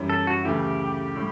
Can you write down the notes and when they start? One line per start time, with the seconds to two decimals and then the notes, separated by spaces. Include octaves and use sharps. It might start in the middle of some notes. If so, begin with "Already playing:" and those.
Already playing: F#2 E3 G3 C#4 E4
0.10 A4
0.27 F#4
0.45 D2 C#3 E3 A3 G4
1.16 A2 G3